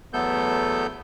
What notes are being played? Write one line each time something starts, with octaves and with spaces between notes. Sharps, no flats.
E2 F#3 A3 B3 A4 G6